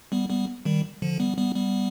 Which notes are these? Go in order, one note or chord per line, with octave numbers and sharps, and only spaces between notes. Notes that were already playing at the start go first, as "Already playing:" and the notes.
G3 B3
G3 B3
D#3 G3
D3 F3
G3 B3
G3 B3
G3 B3